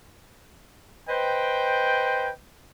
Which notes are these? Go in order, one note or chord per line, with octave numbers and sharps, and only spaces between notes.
B4 C5 D#5 G5